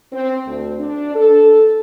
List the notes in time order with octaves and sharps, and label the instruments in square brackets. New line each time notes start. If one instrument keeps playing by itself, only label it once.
[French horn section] C4
D2
D4
A4